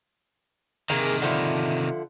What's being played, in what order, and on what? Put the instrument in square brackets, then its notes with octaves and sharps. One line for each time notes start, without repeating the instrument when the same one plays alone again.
[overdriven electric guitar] C3 D#3 [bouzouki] A#3 G#4 A#4
[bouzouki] D3 F3 E4